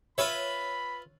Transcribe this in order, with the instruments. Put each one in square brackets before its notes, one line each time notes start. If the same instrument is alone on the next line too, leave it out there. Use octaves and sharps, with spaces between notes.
[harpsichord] F4 B4 E5 [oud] C#5 [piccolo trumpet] B5